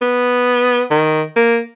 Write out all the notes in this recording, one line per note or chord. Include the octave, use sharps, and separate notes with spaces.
B3
D#3
A#3